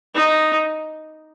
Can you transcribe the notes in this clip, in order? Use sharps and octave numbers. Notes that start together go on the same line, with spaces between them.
D#4